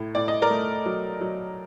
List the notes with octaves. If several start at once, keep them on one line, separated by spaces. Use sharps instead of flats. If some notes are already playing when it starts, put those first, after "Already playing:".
Already playing: A2
A2 D5
D#5
A#4 D5
A3
F#3
F#3